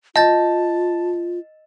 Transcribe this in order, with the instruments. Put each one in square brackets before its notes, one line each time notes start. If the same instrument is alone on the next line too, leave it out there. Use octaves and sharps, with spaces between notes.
[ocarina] F4 [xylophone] D#5 G6 A6 [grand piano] A5